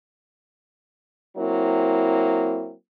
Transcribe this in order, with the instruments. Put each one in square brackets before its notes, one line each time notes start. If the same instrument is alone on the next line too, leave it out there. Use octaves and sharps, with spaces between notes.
[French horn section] F#3 A#3 C4 E4